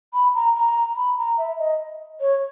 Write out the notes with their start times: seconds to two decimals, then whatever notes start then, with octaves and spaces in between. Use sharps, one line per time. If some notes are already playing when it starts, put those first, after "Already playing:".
0.14 B5
0.35 A#5
0.55 A#5
0.96 B5
1.18 A#5
1.38 E5
1.59 D#5
2.21 C#5